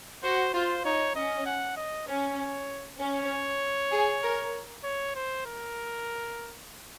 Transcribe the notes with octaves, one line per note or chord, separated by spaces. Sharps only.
F#4 C5
F4 C5
D#4 C#5
C#4 D#5
F#5
D#5
C#4 C#5
C#4 C#5
G#4
A#4
C#5
C5
A#4